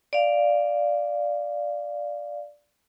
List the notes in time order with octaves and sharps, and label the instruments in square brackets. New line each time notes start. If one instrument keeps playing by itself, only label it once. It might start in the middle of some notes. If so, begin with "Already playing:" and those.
[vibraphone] D5 F5